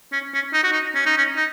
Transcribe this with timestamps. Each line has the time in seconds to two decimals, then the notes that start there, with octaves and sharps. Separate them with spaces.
0.12 C#4
0.34 C#4
0.54 D#4
0.64 F#4
0.72 D#4
0.95 C#4
1.06 D#4
1.17 C#4
1.37 D#4